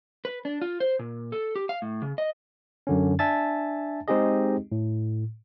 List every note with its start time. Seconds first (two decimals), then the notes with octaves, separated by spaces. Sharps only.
0.25 B4
0.45 D4
0.62 F4
0.80 C5
0.99 A#2
1.32 A4
1.56 G4
1.69 F5
1.82 A2
2.02 C#3
2.18 D#5
2.87 F#2 D3 C#4
3.19 D4 E5 G#5 A5 A6
4.08 G#3 C4 D#4 G4 G#4 D#5
4.72 A2